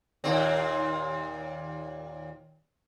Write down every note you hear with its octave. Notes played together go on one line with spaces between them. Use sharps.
D#2 A#2 C4